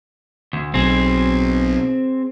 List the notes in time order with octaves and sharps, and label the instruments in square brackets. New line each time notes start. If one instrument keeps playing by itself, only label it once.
[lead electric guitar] D2
[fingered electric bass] B1 [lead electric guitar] C4 G#4